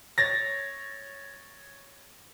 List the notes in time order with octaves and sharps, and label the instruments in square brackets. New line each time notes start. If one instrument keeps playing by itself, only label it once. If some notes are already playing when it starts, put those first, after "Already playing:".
[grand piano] C#5 A6 A#6